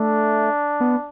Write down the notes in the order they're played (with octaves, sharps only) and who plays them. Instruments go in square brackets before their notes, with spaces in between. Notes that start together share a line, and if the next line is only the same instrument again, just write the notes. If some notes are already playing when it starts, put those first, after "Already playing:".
Already playing: [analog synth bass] A3 [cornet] D4
[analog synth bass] B3